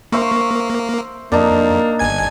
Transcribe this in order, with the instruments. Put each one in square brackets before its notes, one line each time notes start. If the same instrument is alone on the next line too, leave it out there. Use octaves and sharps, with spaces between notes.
[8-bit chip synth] A#3 [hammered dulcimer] C5 E5 C#6
[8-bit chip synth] F2 [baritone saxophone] A#3 [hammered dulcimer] D4 D#4
[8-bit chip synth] G1 G#5 G#6